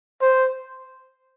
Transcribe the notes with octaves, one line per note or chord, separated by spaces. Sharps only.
C5